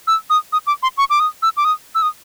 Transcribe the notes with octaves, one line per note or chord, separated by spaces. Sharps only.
E6
D#6
D#6
D6
C6
C#6
D6
D#6
E6
D6
D#6
E6
D#6